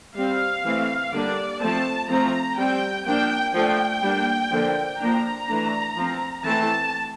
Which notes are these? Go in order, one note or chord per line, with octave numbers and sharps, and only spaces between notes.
G3 C4 F5
E3 A3 C4
D3 G3 A#3 D4 D5
F3 A3 C4 A5
F3 A3 C4 A#5
G3 C4 G5
F3 A#3 D4 G5
F3 A3 D4 G5
G3 A#3 D4
D3 F3 A#3 D4
F3 A#3 D4 A#5
E3 A3 D4
F3 C4
E3 A3 C4 A5